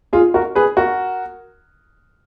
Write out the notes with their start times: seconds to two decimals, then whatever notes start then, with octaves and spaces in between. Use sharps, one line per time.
0.13 F4 G#4
0.34 F#4 A#4
0.55 G#4 B4
0.77 F#4 A#4